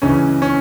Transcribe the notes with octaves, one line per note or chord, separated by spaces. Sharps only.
C#2 C#3 E3 C#4
C#4